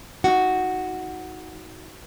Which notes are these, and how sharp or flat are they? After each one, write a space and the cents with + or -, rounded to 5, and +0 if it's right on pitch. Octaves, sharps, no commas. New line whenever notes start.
D#4 +30 F#4 +0 F#5 +0